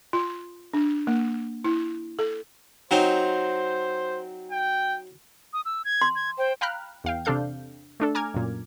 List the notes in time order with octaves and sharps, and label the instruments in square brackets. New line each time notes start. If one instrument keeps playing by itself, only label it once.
[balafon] F4
D4
A#3
E4
A4
[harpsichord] F#3 C4 D#4 [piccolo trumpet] C5
[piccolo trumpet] G5
[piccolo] D#6
E6
G#6
[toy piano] C6
[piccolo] G#6
[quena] C5 [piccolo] G5
[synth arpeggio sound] F5 G5 A#5 B5 F6 F#6
E2 F5 G5
C3 C4 D4 A4 F5 G6
A3 D4 A4
G#5 A#5 D6 F6 G#6
F#2 A#2